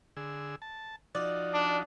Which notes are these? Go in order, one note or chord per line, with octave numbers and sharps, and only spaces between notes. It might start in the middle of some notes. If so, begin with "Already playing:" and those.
D3 G#4 E6
A5
F3 D#4 F#4 D5
D4